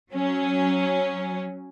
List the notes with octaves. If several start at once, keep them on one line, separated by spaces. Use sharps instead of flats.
F#3 C#4